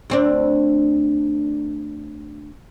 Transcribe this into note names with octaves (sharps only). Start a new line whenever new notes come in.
D2 C4 D4